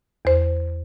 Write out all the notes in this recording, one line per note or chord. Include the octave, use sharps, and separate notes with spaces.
E2 C5